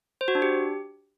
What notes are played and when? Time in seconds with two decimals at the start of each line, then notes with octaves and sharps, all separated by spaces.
0.21 C5
0.28 F#4
0.35 D4
0.42 G4